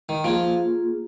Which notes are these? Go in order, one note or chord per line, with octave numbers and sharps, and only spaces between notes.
D#3
F3 A#3 F4 G#4